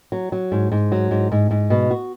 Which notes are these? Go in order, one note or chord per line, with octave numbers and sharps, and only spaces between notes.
F#3
F#3
G#2
G#2
F#3
G#2
G#2
G#2
B2
F#4